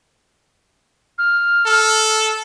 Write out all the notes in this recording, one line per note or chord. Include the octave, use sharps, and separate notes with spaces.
F6
A4